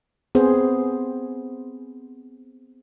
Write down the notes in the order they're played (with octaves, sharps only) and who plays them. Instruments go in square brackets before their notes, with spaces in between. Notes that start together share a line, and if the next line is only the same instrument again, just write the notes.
[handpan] B3 C4 G#4 C5